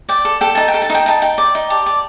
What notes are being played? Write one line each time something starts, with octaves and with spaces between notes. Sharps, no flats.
D5 G5
A4
A4 G5
D#4 A5
G5
A4
A5
D#4 G5
D#4 A5
D#4 G5
D5
D#4
G4 A5
D5